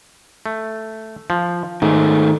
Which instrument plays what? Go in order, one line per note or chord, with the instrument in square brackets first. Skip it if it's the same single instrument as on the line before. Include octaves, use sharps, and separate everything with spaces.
[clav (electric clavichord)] A3
F3
[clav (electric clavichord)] G#2 [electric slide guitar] D#3 A3